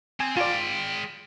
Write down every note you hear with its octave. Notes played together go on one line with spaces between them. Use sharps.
C4 G#5
G#3 F4 D5 G5